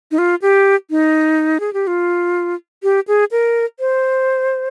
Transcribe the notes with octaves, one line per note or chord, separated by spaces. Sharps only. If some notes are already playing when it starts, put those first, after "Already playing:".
D#4
F4
G4
D#4
G#4
G4
F4
G4
G#4
A#4
C5